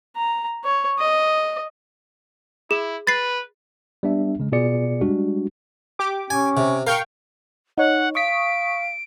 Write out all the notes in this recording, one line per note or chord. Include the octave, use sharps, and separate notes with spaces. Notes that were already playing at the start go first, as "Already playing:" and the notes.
A#5
C#5
D#5
E4 G#4
B4 A6 C7
G3 B3 D4 E5
C#3 G#3
B2 B3 F4 G#4 D5 C#7
G3 G#3 D4 F#4
G4 D6
C#4 G#5
C3
A#4 F5 G5 C#6
D#4 C#5 F#5
F5 C#6 D#6 B6 D7